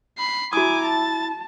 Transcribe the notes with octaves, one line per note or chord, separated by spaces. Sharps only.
B5 C7
E4 F#4 G#5 A#5 D6 D#6
A5 A6